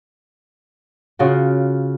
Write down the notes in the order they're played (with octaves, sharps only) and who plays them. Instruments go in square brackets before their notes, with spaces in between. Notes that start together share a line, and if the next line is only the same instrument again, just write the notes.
[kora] C#3 F4 F#4